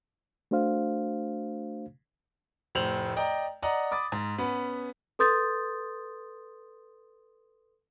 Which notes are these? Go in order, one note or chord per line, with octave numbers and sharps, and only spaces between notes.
A3 D4 F#4 C5 F5
F1 A2 C5 F7 F#7
D5 D#5 G5 A#5
D5 D#5 F#5 A#5 D#6
B5 D6 D#6 A6
G#2
B3 C#4 B5
A4 B4 C6 D#6 G6 A6